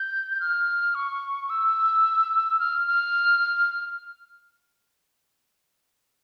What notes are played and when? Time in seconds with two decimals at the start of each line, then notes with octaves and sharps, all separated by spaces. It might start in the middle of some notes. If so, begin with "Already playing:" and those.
Already playing: G6
0.31 G6
0.40 F6
0.95 C#6
1.50 E6
2.60 F6
2.87 F6